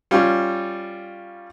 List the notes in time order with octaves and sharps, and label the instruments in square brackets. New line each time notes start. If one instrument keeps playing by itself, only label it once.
[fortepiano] G3 C#4 F4